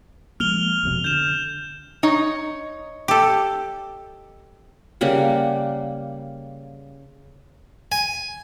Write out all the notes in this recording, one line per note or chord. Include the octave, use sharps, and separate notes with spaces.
F3 G#3 A#3 F6 F7 G7
F1 F2 B2
D3 G6 E7
D#4 C#5
G4 A4
C#3 G3 A#3 F#5
G#5